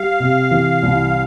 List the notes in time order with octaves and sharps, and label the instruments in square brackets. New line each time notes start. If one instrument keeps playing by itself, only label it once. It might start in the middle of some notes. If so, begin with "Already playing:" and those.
Already playing: [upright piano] G3 [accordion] F5
[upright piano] C3
E3
C2